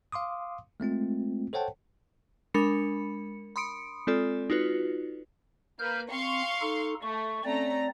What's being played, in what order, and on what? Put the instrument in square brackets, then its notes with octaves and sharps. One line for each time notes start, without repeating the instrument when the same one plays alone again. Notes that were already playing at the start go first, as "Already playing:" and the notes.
[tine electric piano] F5 C6 D6 D#6
G#3 A3 C4 F4
A4 C5 C#5 F#5 G5 A5
[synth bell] G#3 D4 A#4 B5 C#7
B5 C6 D#6 C#7 D7
G#3 C4 F4 A4 D5
D#4 F4 F#4 B4
[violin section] A#3 B4 [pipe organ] F6 G6
[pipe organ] C4 [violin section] F5 C6 C#6
[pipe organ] D#4 A4
[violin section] A3 [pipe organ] C#6
[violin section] A3 C#4 A#5 [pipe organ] C4 D5